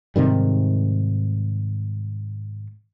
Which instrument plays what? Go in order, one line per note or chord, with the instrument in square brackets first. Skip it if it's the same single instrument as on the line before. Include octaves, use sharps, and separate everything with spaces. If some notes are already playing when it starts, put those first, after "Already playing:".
[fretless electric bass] G#2 C3 D#3 G3